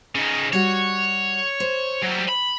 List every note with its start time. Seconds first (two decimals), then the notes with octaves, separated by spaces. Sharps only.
0.16 C#3 D#4
0.53 G3 F#4 C#5
1.60 C5
2.02 F#3 G3
2.28 B5